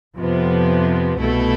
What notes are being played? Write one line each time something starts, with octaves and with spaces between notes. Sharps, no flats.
F2 C3 F3 B3
C2 B2 A3 E4 A4